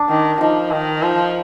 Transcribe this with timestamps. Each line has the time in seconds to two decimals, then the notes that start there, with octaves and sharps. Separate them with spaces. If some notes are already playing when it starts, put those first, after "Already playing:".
Already playing: D4
0.09 D#3
0.41 F3 D#4
0.71 D#3
1.03 F3